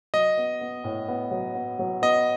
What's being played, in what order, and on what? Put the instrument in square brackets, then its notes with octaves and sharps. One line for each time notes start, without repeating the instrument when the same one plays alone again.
[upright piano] F#3 [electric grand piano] D#5
[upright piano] B3
B3
A2
B3
F#3
B3
F#3
[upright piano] B3 [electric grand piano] D#5